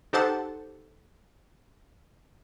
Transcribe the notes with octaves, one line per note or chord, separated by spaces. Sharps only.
D#4 G4 A4 C5 F#5 A5